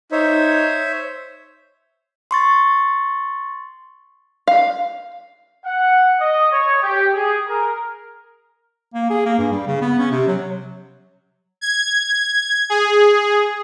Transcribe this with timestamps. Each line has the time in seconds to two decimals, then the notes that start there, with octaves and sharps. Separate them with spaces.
0.12 D#4 C5 C#5 E5
2.31 C6 C#6 A6
4.47 F5
5.65 F#5
6.20 D#5
6.51 C#5
6.82 G4
7.14 G#4
7.48 A#4
8.94 A#3
9.10 G#4
9.25 A#3
9.39 G2
9.51 G3
9.67 C#3
9.81 B3
9.98 C#4
10.11 C3
10.27 F#3
11.61 G#6
12.70 G#4